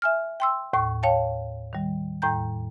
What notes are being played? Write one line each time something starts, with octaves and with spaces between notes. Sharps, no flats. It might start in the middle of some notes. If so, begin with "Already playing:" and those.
E5 G#5 F6
G5 C6 E6
D#2 A2 C#6
C#5 F5 G5 A5
D#3 G3
E2 A2 G5 A#5 G6